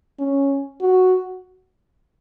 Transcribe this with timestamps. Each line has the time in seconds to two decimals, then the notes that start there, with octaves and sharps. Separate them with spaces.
0.19 C#4
0.81 F#4